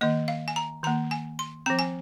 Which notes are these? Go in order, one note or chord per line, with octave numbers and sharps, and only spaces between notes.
D#3 A#3 D#5
F5
G#5
A#5
D#3 A#3 A#5
G#5
C6
F3 C4 A#5
G#5